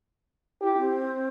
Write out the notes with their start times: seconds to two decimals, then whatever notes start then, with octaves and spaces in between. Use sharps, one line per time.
0.61 E4 G4
0.77 C4